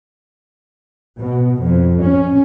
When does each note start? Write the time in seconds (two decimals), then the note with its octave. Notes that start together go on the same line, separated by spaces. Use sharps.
1.20 B2
1.64 F2
2.02 C#4